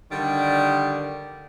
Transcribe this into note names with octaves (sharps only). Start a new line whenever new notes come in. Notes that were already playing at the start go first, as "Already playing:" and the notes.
D3 D#3 G3